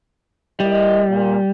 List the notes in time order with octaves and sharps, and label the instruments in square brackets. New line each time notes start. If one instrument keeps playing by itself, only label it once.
[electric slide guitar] G3 [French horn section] E4 A#4 D#5
[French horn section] A#2